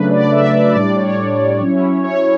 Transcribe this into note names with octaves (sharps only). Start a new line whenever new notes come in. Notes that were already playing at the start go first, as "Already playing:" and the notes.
Already playing: C#3 F#3 A3 D4 B4
D5
E5
D5
A2 G3 D4 D5
C#5
F#3 C#4 E4
C#5